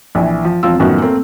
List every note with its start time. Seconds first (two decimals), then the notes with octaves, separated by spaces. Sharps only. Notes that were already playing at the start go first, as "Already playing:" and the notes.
0.15 A#1 E3
0.44 F3
0.63 E1 F3 C4 F4 E6
0.80 F#2 A2 D#3 F3 B3 F#4
1.02 A3 A#3 C4